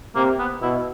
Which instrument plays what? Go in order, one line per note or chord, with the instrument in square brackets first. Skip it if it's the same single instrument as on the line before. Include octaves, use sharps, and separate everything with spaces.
[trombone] C3 [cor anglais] A#3
[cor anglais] B3
[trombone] B2 [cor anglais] E4